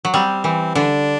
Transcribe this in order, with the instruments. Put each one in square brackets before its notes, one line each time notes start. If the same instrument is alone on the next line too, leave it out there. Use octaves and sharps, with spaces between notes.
[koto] F#3
[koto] G3 [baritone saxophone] C4
[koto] E3 [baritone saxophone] C4
[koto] D3 [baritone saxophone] D4